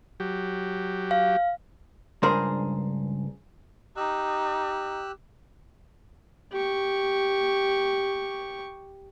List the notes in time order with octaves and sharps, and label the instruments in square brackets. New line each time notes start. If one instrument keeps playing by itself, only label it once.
[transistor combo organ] F#3 G4
[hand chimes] F5
[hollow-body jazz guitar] C#2 G2 D4 G#4 A#4 C5
[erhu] D#4 [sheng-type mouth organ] G4 E6 F#6
[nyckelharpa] G4 C#6